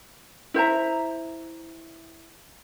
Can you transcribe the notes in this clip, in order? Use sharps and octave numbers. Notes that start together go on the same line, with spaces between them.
E4 C5 E5 A#5